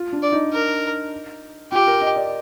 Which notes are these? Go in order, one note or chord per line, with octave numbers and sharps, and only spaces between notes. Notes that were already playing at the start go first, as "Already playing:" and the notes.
Already playing: F4
D4
D5
D#4
A#4
F4 G4
A#4
D#5
D5